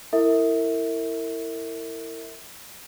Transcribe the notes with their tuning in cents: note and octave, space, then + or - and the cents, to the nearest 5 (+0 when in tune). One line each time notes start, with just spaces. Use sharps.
E4 +0 A#4 -35 E5 -25